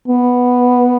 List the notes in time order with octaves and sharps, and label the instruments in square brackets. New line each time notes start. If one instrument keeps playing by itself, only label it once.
[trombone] B3